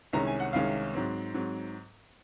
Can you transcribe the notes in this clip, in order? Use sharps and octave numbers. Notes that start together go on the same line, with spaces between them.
C2 C3 D#3 G#3 C#4 A#5
G#5
F#5
C2 C3 D#3 G#3 C#4 F5
G#2 F#3 C4
G#2 F#3 C4